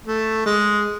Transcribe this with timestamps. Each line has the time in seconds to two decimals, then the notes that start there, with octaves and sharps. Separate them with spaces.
0.06 A3
0.46 G#3